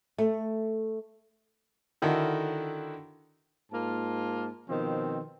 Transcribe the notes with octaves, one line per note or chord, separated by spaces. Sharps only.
A3
D3 D#3 E4 F#4 A4 A#4
G#2 A#3 F4 A5
B2 D#3 F3 C4